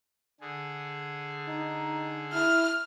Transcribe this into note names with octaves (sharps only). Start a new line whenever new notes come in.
D3 G#4
D#4
E4 F6